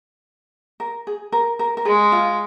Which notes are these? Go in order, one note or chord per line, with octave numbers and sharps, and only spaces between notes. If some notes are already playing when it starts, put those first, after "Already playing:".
A#4
G#4
A#4
A#4
A#4
G#3 G#4
F4